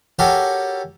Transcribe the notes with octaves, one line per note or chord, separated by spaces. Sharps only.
C#4 F#4 G4 A4 A#4